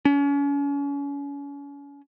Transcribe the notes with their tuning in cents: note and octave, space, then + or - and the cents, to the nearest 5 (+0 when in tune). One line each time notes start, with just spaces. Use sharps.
C#4 +35